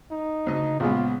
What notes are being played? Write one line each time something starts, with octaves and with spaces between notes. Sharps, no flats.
D#4
D2 C#3 D#5
A#1 C#3 G#3 B3 F4